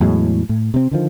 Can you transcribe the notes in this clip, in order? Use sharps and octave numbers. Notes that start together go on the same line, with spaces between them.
E2 A2 F#3 G#3
A2
C3 C4
D3 D#3 F3